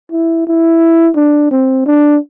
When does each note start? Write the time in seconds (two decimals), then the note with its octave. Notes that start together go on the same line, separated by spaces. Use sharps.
0.12 E4
0.47 E4
1.16 D4
1.51 C4
1.86 D4